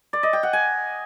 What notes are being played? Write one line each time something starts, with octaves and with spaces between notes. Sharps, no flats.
D5
D#5
G5
F#5
G#5